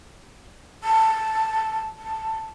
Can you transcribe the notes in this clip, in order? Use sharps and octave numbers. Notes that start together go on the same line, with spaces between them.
A5
A5